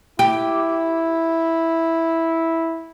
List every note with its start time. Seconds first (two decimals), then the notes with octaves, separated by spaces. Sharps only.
0.19 E4 G4